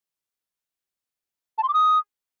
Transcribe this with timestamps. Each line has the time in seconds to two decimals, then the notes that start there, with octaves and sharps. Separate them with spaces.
1.58 A5
1.63 C6
1.69 D6
1.74 D#6